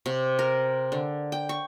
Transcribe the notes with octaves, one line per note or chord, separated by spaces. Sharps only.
C3
A#4
D3
G5
C#6